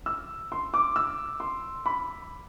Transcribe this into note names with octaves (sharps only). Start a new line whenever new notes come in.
E6
C6
D6
E6
C6
B5